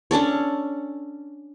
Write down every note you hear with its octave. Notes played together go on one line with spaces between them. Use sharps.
C#4 D4 A4 C#5